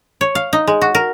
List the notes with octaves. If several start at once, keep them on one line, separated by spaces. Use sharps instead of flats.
C#5
F5
D#4
G#3
F#4
A#4